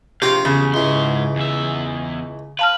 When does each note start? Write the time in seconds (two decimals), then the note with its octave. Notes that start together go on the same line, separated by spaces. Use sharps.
0.22 A#1 C3 G4 C#5 F5 A#5
0.45 E2 C#3
0.74 C#2 G#2 E3 C6
1.36 E2 E5
2.59 B4 F5 A5 F6